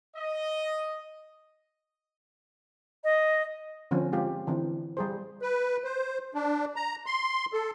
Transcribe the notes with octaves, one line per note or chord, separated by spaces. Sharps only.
D#5
D#5
D3 F3 C4 C#4
G#3 C4 F4 G4
D3 E3 C4
G3 G#4 C5
B4
C5
D4
A#5
C6
A4